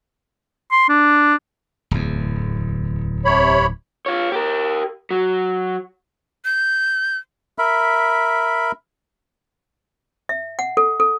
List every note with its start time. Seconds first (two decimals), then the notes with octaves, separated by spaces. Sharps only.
0.71 C6
0.89 D4
1.91 D1 E2
3.25 C3 C#5 B5
4.06 F4 C#5
4.32 G4 A#4
5.11 F#3
6.45 G6
7.58 A#4 E5 B5
10.29 E5
10.59 F#5
10.77 A4
11.00 A4